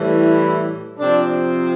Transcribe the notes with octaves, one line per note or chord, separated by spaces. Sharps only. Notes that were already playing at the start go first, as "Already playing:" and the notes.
Already playing: A2 E3 G3
E4
C3 F3 C4 D4